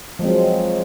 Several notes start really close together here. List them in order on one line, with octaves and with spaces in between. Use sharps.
F3 G#3 C4 F#3